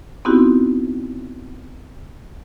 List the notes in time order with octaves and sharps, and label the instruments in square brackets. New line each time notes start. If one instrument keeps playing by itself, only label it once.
[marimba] B3 C4 D#4 E4 F#4 G4